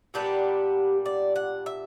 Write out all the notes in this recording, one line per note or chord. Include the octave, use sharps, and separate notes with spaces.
A#2 G3 B3 D4 G4
D5
F#5
E5